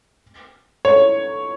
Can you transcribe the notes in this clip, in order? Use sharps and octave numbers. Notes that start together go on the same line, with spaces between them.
C#5